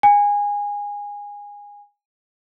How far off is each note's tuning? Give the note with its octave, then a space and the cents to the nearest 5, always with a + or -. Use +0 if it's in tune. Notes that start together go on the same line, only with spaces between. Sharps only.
G#5 -20